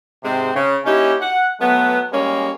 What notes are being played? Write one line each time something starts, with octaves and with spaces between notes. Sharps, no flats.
G#2 C3 G#3 C4
C#3
A#3 C#4 D#4 E4 G4
F#5
F#3 A3 B3
G3 G#3 A#3 C#4